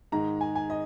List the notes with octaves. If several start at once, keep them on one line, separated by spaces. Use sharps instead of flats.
G#2 D#3 G#3 A#5
G#5
G#5
D#5